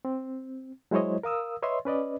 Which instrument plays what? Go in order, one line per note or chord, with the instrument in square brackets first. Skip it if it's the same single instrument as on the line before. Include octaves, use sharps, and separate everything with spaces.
[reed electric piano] C4
F#3 G#3 E4 C5 C#5 D#5
A#4 F5 D#6 E6
B4 C#5 D#5 E5 C6
C#4 B4 D5 D#5